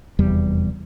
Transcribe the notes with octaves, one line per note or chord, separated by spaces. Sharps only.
F1 E2 G3